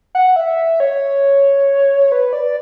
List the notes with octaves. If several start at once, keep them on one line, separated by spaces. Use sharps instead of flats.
F#5
E5
C#5
B4
D5